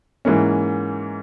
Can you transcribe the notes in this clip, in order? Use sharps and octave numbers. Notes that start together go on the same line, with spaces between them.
G#2 E3 A#3 C#4